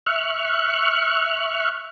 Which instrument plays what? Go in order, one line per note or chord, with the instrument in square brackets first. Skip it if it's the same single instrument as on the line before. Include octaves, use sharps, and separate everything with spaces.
[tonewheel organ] E5 C#6 F6 F#6